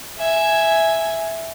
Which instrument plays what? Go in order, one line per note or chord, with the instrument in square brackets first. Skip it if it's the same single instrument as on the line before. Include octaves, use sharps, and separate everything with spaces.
[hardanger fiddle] E5 G#5